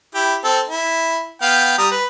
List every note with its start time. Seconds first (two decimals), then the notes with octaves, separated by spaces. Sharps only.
0.15 E4 G4
0.44 C4 A4
0.68 E4
1.42 B3 F5 G5
1.78 G3 A#5 D#6
1.91 B4